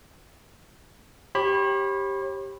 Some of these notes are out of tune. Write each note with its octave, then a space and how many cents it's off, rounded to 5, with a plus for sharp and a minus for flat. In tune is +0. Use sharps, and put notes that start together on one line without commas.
G4 +0 C#5 -45 B5 +0